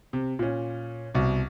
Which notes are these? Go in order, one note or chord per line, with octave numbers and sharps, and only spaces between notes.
C3
A#2 C#4
C2 B2